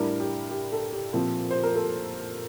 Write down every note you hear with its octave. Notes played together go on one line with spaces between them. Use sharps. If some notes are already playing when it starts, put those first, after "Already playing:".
Already playing: A2 G3 D4 A#4
G4
G4
A4
G4
A#2 F3 C4
C5
A#4
A4